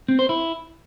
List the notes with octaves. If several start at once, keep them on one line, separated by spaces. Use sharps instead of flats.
C4
C5
E4